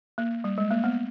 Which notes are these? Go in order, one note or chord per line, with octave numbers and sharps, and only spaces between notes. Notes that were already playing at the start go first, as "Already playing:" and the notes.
A#3
G3
G#3
A#3
B3